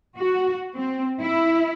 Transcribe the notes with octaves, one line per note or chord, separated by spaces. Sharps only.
F#4
C4
E4